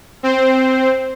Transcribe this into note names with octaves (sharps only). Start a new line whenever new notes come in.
C4 C5